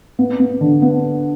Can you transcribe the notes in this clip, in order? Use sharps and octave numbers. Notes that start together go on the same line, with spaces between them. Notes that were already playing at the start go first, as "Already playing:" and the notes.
B3
B3
D3
B3